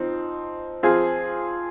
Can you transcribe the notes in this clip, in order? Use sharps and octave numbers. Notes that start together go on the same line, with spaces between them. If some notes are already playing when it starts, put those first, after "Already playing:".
Already playing: F3 C4 D#4
F3 C4 F4 G#4